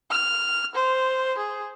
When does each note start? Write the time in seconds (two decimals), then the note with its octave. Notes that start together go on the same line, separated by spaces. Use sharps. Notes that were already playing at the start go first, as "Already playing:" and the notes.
0.11 F6
0.75 C5
1.38 G#4